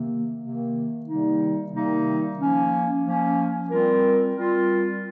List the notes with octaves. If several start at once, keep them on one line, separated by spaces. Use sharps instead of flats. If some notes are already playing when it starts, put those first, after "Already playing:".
Already playing: C3 D#3 A#3
C3 D#3 A#3
C3 D#3 G3 A#3 D#4
C3 D#3 G3 A#3 D#4
F3 A#3 C#4
F3 A#3 C#4
G3 C4 F4 A#4
G3 C4 F4 A#4